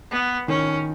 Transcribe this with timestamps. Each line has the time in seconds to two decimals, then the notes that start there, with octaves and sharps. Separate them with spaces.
0.11 B3
0.48 D#3 C#4